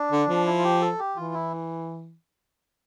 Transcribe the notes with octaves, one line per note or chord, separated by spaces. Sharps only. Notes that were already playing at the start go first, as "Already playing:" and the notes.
Already playing: D4
D3
F3
E4
F4
G4
A4
G4
E3 F4
E4